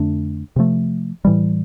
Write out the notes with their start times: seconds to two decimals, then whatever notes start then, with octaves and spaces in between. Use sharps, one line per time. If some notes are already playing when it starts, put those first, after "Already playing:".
Already playing: F2 D3 A3 D4
0.56 C3 F3 A3
1.25 A2 E3 G3